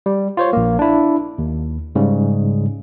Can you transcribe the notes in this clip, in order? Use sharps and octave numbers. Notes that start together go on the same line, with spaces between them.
G3
F4 C5 C#5
A#1 A#3
D4 E4
D#2
G#2 C#3 G3